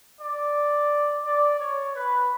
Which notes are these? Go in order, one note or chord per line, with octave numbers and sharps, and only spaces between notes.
D5
D5
C#5
B4